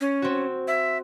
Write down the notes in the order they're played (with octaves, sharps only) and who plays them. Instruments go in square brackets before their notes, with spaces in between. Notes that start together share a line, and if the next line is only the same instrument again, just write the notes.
[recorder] C#4
[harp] C4 F#4
[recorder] E5